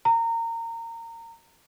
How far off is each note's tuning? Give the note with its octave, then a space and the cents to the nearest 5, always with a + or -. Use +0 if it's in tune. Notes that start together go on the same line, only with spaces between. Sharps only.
A#5 -25